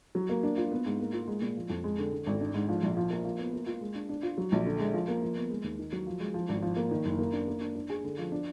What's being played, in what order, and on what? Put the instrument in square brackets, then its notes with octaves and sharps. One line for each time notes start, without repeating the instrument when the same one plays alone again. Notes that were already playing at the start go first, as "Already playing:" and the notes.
[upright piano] F#3
A#3
D4
F4
B3
G#2
A#3
F4
G#3
A#2
F3
F2
G#3
D3
D3
G#1
D4
G#2
F3
A#1
F3
A#3
F3
B3
A#3
F4
G#3
D4
D4
F4
F#3
A#1
D3
G#3
F3
A#3
F3
B3
G#3
D#2
D#3
F#3
F3
G#3
F3
G#1
F3
A#3
D#3
F#1
A#3
D4
A#3
D4
D4
G#4
D3
F3
D4